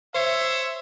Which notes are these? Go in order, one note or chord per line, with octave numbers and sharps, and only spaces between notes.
C5 C#5 E5